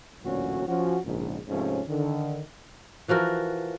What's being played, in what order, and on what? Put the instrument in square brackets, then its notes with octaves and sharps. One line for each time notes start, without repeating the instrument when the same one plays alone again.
[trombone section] A1 D2 A#2 F#3 C#4 F#4
F3 C#4 F#4
A#1 G#2 C#3
G#2 C3 F3 A3 C#4
D3 D#3
[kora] E3 F3 F#4 A#4